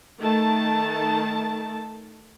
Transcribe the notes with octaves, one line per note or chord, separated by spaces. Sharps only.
D#3 A3 A5